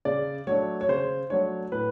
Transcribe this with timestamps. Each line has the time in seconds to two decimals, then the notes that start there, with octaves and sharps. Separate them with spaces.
0.05 C#3 D5
0.47 F#3 A3 D4 C#5
0.81 C#5
0.89 C#3 C5
1.30 F#3 A3 D4 C#5
1.71 A2 B4